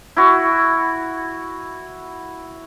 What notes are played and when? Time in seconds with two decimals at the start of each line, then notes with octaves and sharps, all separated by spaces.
0.17 E4 F#4